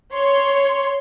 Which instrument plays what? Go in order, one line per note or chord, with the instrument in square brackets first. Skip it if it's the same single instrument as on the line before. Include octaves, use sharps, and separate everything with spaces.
[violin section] C#5 C6